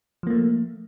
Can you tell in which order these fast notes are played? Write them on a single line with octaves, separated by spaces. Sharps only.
F3 A#3 A3